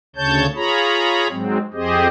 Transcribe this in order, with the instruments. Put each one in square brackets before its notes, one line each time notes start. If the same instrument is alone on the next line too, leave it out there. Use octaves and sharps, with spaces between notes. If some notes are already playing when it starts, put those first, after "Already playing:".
[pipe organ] D2 C#3 C#5 A5 G6
F4 G#4 C#5 A#5 B5
G#2 F#3 G#3 C4
F2 C4 G4 G#4 C5 D#5